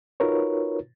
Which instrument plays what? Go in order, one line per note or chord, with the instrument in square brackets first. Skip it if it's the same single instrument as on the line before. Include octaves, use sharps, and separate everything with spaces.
[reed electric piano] D#4 F4 F#4 A#4 B4 C#5